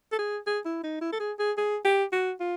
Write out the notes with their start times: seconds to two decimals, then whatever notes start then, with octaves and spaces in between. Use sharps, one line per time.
0.12 A4
0.19 G#4
0.46 G#4
0.65 E4
0.84 D#4
1.01 E4
1.12 A4
1.20 G#4
1.39 G#4
1.57 G#4
1.85 G4
2.12 F#4
2.40 F4